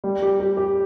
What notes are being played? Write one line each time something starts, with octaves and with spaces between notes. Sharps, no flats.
G3
G4
G4
G4